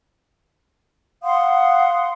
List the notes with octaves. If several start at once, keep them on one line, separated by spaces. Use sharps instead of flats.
F5 F#5 C6 D#6